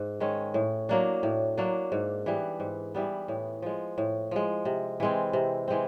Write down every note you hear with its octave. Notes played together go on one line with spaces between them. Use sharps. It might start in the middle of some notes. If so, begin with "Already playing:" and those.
Already playing: G#2
D#3 G#3 C#4
A2
F#3 A#3 D4
A2
F#3 A#3 D4
G#2
E3 G3 B3
G#2
E3 G3 B3
A2
F3 G#3
A2
F3 G#3
C3
E3 G#3 C4
C3
E3 G#3 C4